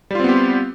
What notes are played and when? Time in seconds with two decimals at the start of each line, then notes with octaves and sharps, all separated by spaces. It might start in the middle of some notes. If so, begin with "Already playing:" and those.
0.11 G3
0.15 F4
0.20 C4
0.24 B3
0.29 G4